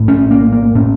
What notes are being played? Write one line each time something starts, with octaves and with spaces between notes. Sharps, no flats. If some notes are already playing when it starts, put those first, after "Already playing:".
Already playing: A#1 A2
C#4
A#3
A#3
A2 C#4